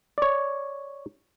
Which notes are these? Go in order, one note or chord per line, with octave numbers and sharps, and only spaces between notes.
C#5 D5